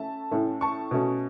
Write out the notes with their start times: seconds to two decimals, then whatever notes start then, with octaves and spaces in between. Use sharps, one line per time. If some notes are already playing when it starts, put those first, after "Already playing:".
Already playing: A3 C#4 E5 A5
0.31 A2 A3 C#4
0.61 A5 C#6
0.91 B2 A3 C#4